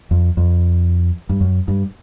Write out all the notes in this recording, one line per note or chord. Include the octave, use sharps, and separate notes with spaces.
F2
F2
G2
F#2
G2